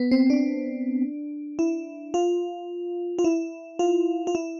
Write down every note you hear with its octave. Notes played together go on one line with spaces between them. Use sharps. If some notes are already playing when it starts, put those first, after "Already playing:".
Already playing: B3
C4
D4
E4
F4
F4
E4
F4
F4
E4